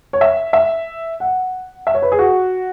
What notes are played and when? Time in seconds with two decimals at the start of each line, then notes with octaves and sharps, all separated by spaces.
0.13 C#5
0.21 E5
0.53 E5
1.20 F#5
1.87 E5
1.94 C#5
2.02 B4
2.12 G#4
2.19 F#4